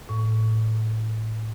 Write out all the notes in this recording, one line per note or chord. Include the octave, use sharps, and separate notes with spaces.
A2